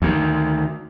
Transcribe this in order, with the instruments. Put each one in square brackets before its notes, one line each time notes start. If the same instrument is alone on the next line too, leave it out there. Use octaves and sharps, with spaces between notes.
[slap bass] D2 D#3